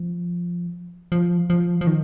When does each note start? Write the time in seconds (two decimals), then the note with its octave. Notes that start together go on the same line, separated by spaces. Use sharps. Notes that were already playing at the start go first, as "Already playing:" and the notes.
Already playing: F3
1.12 F3
1.50 F3
1.81 F3
1.87 D#3